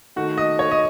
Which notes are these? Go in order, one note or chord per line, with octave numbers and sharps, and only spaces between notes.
D#3 A3 F#4
D#5
C#5
D#5